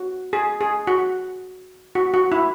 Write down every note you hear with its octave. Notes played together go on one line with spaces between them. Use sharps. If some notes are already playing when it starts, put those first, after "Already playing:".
Already playing: F#4
G#4
G#4
F#4
F#4
F#4
E4